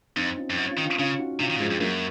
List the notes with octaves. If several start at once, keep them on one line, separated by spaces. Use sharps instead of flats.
F2 C4 D#4
C#4 F4
F2
F#2
C#4 F4
D#3
C#4 F4
C#3 C#4 F4
D#4 F#4
C3 C#4 F4
D#3
A#2
G#2 F3 G#3
F2
F#2 F#3 A#3